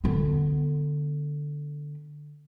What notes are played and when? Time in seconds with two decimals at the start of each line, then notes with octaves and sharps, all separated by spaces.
0.04 D3 B3